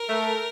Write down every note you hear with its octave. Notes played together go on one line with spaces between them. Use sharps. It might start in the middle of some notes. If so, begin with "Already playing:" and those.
Already playing: A#4
A3